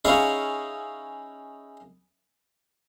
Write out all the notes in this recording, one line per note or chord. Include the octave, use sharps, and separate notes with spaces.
C#4 D#4 E4 G#4 C#5 F5